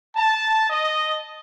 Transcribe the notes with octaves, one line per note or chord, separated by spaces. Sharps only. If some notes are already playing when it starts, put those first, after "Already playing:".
A5
D#5